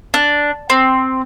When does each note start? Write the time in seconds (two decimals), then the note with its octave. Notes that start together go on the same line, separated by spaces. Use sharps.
0.14 D4
0.70 C4